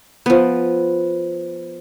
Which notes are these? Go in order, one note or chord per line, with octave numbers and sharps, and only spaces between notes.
F3 B3